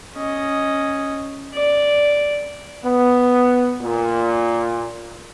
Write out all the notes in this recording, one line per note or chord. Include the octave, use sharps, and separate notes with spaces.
C#4 D#5
D5
B3
A#2